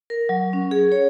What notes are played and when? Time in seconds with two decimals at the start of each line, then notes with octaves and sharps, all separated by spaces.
0.10 A#4
0.29 F#3
0.53 C#4
0.71 G#4
0.92 C#5